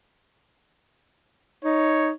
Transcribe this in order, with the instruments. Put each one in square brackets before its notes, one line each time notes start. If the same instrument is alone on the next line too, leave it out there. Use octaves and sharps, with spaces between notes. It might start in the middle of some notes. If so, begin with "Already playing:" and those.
[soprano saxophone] D#4 [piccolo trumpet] C#5